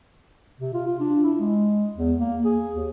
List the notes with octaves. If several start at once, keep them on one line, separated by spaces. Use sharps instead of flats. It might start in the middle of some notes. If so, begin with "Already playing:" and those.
C3
F4
F4
D4
E4
G#3
E2
A#3
G#4
D#2